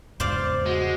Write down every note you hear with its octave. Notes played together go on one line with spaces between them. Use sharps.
E2 G#2 C#3 C5 D5 F5
G#3 F#4